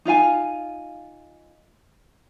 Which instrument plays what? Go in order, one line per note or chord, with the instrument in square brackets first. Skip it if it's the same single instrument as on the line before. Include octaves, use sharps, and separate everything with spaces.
[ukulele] D#4 F4 F5 G#5